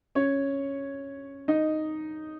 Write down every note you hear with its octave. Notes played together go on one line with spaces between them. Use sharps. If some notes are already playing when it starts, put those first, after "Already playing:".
C#4 C#5
D#4 D#5